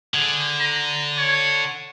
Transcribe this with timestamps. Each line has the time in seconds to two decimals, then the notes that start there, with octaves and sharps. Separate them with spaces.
0.14 D3 G#4
0.60 A#5
1.18 C#5